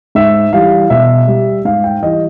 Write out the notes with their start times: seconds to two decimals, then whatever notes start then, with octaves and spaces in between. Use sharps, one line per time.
0.15 G#2 E5
0.53 E3 G3 F5
0.90 B2 E5
1.28 G3
1.65 G#2 F5
1.84 G5
2.02 E3 G3 D#5